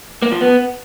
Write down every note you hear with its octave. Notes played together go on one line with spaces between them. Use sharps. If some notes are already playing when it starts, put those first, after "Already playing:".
A#3
F3
B3